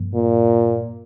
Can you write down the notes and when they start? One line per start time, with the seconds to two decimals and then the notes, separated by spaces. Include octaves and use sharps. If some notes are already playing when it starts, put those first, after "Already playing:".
Already playing: G2 F3 A#3
0.14 A#2